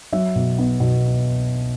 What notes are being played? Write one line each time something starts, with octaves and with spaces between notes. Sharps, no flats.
F#3 E5
B2
B3
B2